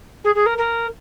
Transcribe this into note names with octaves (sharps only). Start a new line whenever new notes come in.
G#4
G#4
A#4
A#4